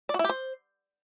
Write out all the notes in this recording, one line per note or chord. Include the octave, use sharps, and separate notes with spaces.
D5
F#4
E4
G4
C5